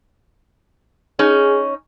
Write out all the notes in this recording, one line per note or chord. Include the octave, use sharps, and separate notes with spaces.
C#4 D#4 G#4